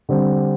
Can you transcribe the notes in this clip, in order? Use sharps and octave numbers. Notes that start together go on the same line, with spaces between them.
D3 G3 C4